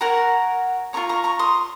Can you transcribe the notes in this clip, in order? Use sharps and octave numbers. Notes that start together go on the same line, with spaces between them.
F#4 A#4 C#5 F#5 A#5
F4 A#4 C#5 A#5 C#6
A#5 C#6
A#5 C#6
C6 D#6